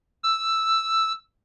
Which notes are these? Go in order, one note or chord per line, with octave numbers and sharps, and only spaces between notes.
E6